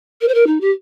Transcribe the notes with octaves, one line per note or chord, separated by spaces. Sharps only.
A#4
C5
A#4
D#4
G4